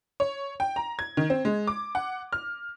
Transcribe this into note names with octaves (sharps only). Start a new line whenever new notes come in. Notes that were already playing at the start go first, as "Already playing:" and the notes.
C#5
G5
A#5
G#6
D#3
C4
G#3
D6
F#5
F6